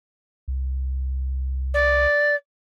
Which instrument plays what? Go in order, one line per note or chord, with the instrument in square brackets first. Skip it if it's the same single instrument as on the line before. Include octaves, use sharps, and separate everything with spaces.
[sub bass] C2
[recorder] D5